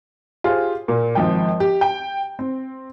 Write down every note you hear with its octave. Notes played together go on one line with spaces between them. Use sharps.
F4 G4 G#4 C5
A#2
G#1 F3 G5
G4
G5
C4